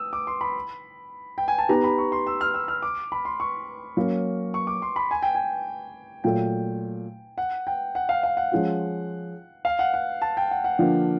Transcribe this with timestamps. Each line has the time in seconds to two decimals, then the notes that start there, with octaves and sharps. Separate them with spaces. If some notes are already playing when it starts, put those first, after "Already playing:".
Already playing: D#6 E6
0.13 D6
0.27 C6
0.41 B5
1.38 G5
1.48 G#5
1.58 A5
1.69 B3 D#4 G4 B4 A#5
1.84 B5
1.98 C#6
2.12 C6
2.27 E6
2.41 F6
2.54 E6
2.68 F6
2.82 D6
3.12 B5
3.25 C6
3.40 C#6
3.97 F#3 A#3 C#4
4.54 C#6
4.67 D6
4.82 C6
4.96 B5
5.11 G#5
5.23 G5
5.35 G#5
6.24 A#2 F#3 A3 G5
7.38 F#5
7.67 G5
7.95 F#5
8.09 F5
8.23 F5
8.37 F#5
8.52 F3 G#3 C#4 F4
9.65 F5
9.79 F#5
9.94 F#5
10.22 A5
10.37 G5
10.51 F#5
10.64 F#5
10.79 D3 F3 A#3 D4